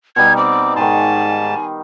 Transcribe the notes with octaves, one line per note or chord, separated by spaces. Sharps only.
B2 G3 D#4 G#6
C4 D6
G#2 D#3 G#5 A5 C6